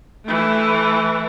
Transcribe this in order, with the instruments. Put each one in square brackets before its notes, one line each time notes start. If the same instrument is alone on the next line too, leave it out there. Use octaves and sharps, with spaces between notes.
[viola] E3 A3